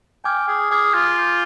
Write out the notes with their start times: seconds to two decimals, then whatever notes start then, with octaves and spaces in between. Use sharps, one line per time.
0.24 G5 G#5 D6 F6 G#6
0.48 G#4
0.70 G#4 G#5 D6 F6 G#6
0.94 F4
1.16 D6 G6 C7 G7